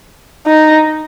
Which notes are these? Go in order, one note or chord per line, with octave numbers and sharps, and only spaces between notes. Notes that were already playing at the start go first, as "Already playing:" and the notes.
D#4